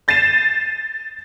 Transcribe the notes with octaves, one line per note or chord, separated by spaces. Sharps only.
G6 A6 C7 D#7 E7